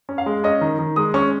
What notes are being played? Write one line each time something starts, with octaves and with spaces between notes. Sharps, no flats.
C#4
F5
G#3
C#4 D#5
D#3
D#3
G#3 D#6
C#4 C#6